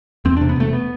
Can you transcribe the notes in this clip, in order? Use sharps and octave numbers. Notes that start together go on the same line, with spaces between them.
E2 C4
D4
C3
B3
E1 A3
B3